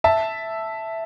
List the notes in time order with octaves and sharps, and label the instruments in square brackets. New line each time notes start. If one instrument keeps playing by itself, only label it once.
[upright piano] E5 A5